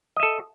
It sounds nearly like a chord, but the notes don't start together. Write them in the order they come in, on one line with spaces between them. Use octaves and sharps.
D#5 E5 A4